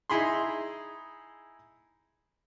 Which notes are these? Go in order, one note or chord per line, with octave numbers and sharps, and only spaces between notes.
D#4 E4 G#4 B5 C6